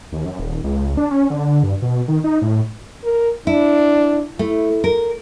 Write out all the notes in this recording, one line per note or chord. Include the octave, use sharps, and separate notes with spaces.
D#2
F#2
D#1
C#2
D4
C#4
D3
G2
B2
D#3
D#4
A2
A#4
D4 E4
A3 E4
A#4